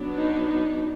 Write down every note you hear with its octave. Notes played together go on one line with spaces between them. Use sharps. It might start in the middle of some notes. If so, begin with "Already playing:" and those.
Already playing: F#3 B3 D4
D#4
D#4